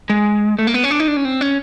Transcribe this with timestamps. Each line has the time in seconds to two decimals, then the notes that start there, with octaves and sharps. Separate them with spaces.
0.10 G#3
0.59 A3
0.67 A#3
0.74 B3
0.84 C#4
0.91 D4
1.00 D#4
1.08 D4
1.17 C#4
1.25 C4
1.41 C#4